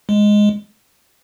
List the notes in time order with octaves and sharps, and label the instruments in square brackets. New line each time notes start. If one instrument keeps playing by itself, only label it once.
[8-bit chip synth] G#3